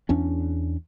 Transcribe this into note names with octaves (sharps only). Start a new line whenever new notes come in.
E2 C#4 D4